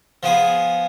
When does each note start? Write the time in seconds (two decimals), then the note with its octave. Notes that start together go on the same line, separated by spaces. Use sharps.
0.23 F3 B3 G#4